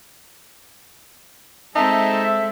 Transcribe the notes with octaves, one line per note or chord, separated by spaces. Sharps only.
G#3 C4 D#4 A4 E5 A5